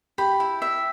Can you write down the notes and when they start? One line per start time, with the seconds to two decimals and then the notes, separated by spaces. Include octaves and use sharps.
0.18 G4 B5
0.40 E4
0.62 E5